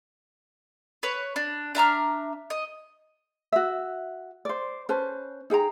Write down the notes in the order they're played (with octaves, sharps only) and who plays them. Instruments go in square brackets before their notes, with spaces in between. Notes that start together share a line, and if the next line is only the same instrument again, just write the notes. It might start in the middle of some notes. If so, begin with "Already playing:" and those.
[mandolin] B4 C#5
D4
D4 E5 A#5 F6
D#5
[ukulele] F#4 E5
C5 D5
C#4 B4 C5 A5
D#4 G#4 G5 A#5